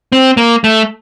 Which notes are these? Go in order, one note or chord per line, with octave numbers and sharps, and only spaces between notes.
C4
A#3
A3